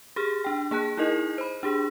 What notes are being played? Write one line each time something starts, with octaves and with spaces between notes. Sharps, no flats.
G4 G#4 F6
D4 G5
A#3 G#4 A5 F#6
D#4 E4 G#4 A#4 D#5
C5 B5
D4 G4 G#4